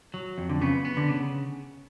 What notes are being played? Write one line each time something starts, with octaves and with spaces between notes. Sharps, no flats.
F#3
F2
D3
C#3 B3
B3
D3
C#3